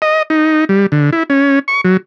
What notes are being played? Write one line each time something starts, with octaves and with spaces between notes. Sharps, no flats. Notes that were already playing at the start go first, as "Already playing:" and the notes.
D#5
D#4
G3
D3
E4
C#4
C#6
F#3